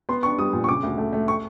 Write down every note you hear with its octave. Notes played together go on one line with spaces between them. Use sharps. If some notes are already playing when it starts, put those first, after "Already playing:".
B3 C6
D4 C#6
G3 D#6
A#2
C#6
C#3 D6
D2
A3
A3
C#6